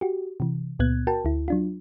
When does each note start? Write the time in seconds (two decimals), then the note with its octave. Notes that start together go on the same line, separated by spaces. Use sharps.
0.01 F#4 G4
0.40 C3 E3
0.79 C#2 A#2 B3 F#6 G#6
1.07 F#4 A#4 G5 A5
1.25 D2 E4
1.48 F#3 D4 F4